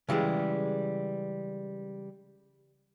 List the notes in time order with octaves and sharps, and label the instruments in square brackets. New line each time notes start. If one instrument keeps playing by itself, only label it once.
[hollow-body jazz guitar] C#3 E3 G3 G#3